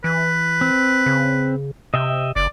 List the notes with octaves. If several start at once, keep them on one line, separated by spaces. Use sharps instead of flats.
E3 B4
C4
C#3
C3 D#5 E5 G5
F#1 D5